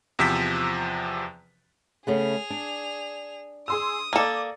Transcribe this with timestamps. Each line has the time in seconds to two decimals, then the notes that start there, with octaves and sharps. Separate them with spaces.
0.19 E2 C3 F3 E6 B6
2.07 C#3 A3 B3 G#4 F7
2.50 D4
3.68 G#4 C6 D#6 E6
4.13 A#3 A4 D5 D6